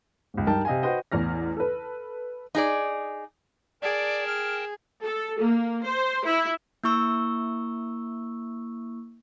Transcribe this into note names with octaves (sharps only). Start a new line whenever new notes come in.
C#2 G#2
G2 D#4 A#4 G5 A5
C3 D#5 F5 G#5
F#4 B4 C5 D#5 G5
A1 E2 F6 A#6
A4 B4
D#4 G#4 D5
G#4 A#4 D5 G5 A5
F6
A4
A#3
C5
E4
A#3 E4 C#6 E6